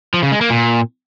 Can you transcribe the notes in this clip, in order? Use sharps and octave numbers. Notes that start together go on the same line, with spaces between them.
F3
C#3
G#3
A#3
A#2